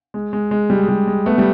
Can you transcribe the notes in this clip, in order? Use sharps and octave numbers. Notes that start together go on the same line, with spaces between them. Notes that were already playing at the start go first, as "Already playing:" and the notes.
G#3
G#3
G#3
G3
G#3
G3
G#3
A3 B3
G3